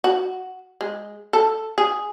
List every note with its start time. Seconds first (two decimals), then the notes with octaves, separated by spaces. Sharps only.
0.04 F#4
0.81 G#3
1.33 A4
1.78 G#4